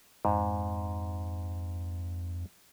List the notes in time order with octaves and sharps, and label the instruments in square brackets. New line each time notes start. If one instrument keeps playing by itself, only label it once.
[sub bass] F2 [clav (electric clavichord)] G#2